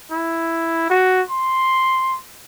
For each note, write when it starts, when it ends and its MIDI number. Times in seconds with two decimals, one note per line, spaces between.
0.11 0.86 64
0.90 1.22 66
1.30 2.17 84